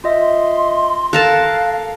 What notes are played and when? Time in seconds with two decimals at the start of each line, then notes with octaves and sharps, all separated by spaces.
0.04 F4 D#5 E5 C6
1.13 A4 A#4 F5 A5 F#6